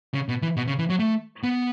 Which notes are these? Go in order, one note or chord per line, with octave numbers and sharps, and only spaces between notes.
C#3
B2
E3
B2
C#3
E3
F#3
A3
B3